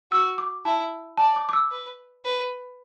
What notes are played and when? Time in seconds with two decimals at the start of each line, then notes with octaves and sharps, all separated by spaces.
0.11 F#4 E6
0.38 D6
0.65 E4 A5
1.17 D5 A5
1.36 D6
1.49 D6
1.53 E6
1.71 B4
2.25 B4